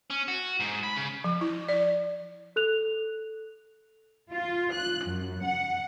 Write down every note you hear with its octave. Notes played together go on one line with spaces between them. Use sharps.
C#4
F#4
G#2
B5
C#3
F3
E4
D5
A4 F#6 F7
F4
F#6
F#2
F#5